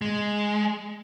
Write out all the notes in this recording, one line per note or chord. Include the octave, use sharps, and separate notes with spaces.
G#3